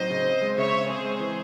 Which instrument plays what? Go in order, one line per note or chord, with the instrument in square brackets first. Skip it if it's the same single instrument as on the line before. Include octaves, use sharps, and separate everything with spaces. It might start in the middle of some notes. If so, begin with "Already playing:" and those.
Already playing: [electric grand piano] A2 F#3 C4 D#4 [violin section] C5 D#5
[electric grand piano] C#3
C4
G#3
[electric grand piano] C#3 [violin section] C#5 E5
[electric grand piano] C#3
[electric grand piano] C4 [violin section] G#4 C5
[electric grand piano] G#3
E3